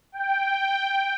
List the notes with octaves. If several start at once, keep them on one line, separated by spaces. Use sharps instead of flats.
G5